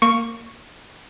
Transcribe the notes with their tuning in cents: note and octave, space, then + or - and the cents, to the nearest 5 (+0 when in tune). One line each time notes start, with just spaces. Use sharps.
A#3 -15 C#6 +0